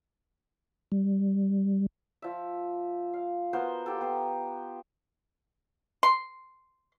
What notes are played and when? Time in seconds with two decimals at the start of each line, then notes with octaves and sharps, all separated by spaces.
0.92 G3
2.22 F3 E5
3.13 F5
3.53 B3 F#4 A#4 C5
3.86 F4 G4 A4
4.01 B3 C5 A#5
6.03 C6